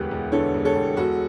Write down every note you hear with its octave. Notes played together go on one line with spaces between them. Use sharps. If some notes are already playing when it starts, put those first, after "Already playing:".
Already playing: E1 D2 G4 B4
E1
D3 A4 C#5
E1
A4 C#5
E1
E1 F#4 A4